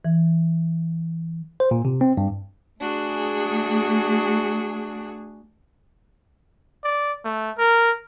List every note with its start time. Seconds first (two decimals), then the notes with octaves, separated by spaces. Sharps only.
0.05 E3
1.60 C5
1.71 A#2
1.85 C3
2.01 C4
2.17 G2
2.81 A3 D4 F#4 G#4
6.84 D5
7.25 A3
7.58 A#4